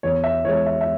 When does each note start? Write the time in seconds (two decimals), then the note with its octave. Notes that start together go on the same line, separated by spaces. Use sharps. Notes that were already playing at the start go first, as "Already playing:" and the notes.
0.03 E2 C#5
0.24 E5
0.45 E3 G#3 C#5
0.66 E5
0.81 E5